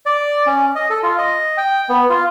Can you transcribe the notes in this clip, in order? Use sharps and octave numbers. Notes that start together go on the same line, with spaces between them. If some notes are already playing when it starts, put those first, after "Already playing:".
D5
C#4
D#5
A4
F4
D#5
G5
B3
F4